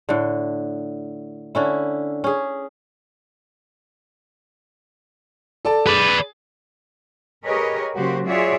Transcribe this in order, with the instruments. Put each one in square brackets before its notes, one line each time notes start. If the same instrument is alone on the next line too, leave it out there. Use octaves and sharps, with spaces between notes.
[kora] A2 D3
D3 C#4 E4
C#4 G#4
[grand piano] A4 D5 A5
[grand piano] G#4 [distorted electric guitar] B4 D5
[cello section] G4 G#4 A#4 B4 C#5 D#5
C#3 F#3 A#3 F#4 G4 C5
F4 F#4 G#4 C#5 D5 E5